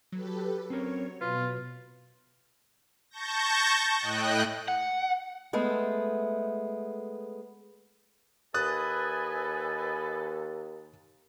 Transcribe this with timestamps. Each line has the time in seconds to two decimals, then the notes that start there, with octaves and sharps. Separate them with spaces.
0.12 F#3 G4 A4 B4
0.70 C4 C#4 A#4 C#5
1.21 B2 F4 B4
3.10 A5 C#6 G6 A#6
3.99 A2 D#5 G5 F#6
4.68 F#5
5.53 G#3 A3 B3
8.54 D#2 A4 B4 D#5 G#5 D#6 F#6 A6